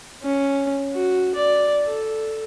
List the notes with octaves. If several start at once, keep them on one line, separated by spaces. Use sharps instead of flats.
C#4
F#4
D5
A4